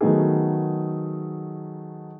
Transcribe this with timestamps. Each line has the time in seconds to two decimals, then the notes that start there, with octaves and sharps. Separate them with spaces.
0.01 D#3 F#3 A3 B3 D#4 G#4